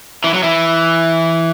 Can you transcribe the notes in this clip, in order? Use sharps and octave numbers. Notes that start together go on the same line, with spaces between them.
E3
F#3
E3